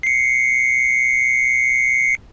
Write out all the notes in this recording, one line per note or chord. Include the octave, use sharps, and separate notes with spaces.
C7 C#7